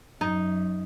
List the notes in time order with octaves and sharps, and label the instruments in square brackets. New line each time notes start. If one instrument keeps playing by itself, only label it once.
[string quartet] F#2 [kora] D#4